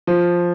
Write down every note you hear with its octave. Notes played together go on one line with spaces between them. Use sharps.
F3